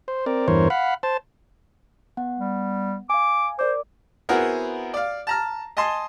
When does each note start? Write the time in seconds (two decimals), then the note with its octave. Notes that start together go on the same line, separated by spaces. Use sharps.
0.08 C5
0.26 C4 A#4 D5
0.48 E2 G2 E3 A#4 C5 C#5
0.70 F5 F#5 B5
1.03 C5 A5
2.17 B3 F#5
2.39 G3
3.10 F5 G#5 D6
3.59 A#4 C5 D5 D6
4.29 B3 C4 E4 F#4 G#4 A#4
4.94 D5 F5
5.27 A5 A#5 F6
5.77 D#5 G#5 A5 C6